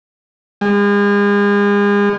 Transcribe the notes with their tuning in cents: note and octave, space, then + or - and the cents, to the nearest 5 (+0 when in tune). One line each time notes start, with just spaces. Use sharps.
G#3 -40